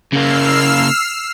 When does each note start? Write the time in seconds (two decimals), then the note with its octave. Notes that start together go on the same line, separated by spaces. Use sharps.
0.13 C#3 A#3 E6 F6 C7